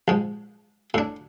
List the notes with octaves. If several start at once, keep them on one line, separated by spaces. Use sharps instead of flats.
A#1 G#2
A2 D4